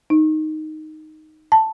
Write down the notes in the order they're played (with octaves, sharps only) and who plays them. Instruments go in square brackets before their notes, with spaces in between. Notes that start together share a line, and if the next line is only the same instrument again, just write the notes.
[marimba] D#4
A5